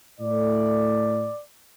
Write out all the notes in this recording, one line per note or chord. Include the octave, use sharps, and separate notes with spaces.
A2 A3 D5